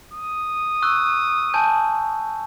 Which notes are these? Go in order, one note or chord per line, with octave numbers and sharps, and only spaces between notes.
D#6
C#6 E6 F#6
G#5 A5 G6